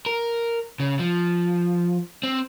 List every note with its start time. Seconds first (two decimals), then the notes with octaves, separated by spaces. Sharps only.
0.06 A#4
0.80 C#3
0.99 F3
2.23 C4